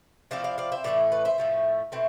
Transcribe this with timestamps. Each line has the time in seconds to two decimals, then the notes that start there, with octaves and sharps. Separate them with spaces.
0.31 F3 A3 C4 E4 D5 F5
0.44 D5 F5
0.58 D5 F5
0.72 C5 E5
0.84 A2 E3 A3 E4 D5
1.12 B4 D5
1.25 C5 E5
1.38 A2 F3 A3
1.92 B2 A3 C4 E4